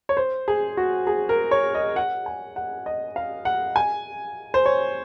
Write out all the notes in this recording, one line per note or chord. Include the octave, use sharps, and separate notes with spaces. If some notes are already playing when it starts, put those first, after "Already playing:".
C#5
C5
G#4
F#4
G#4
A#4
C#5
D#5
F#5
G#5
F#5
D#5
F5
F#5
G#5
C5
C#5